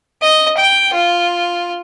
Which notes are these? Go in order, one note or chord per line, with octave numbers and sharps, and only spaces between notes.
D#5
G5
F4